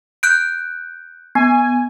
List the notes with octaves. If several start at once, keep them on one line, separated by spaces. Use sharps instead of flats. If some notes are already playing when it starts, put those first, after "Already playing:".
F#6 G6 D7
B3 G#5